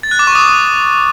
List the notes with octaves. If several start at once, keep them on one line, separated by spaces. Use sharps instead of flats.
A6
F#6
D6
C#6
D#6